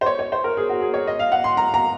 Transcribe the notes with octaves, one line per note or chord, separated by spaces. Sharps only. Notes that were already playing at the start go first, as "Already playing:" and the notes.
C5
C#5
C#5
C5
A#4
G#4
F#4
G#4
C#5
D#5
F5
F#5
C6
A#5
A#5